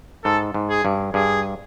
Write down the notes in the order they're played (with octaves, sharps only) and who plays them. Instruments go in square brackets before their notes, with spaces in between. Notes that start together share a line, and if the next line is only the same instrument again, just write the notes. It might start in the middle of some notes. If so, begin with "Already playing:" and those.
[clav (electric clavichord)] G#2 [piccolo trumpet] A4
[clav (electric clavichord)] G#2
[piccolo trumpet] G#4
[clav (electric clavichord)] G2
[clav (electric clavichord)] G2 [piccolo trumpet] G#4